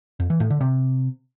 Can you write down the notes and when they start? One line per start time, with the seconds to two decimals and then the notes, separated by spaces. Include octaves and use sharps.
0.20 F2
0.30 E3
0.40 A2
0.50 D3
0.61 C3